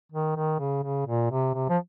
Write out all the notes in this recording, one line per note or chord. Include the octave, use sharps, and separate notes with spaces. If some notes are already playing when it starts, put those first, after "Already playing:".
D#3
D#3
C#3
C#3
A#2
C3
C3
F3